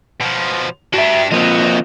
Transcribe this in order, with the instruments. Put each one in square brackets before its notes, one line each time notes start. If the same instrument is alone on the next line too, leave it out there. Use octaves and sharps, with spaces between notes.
[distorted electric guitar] B2 F3
[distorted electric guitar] D4 G4 [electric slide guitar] F#4 E5
[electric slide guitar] F3 A#3 C4 [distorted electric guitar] F#4 D#5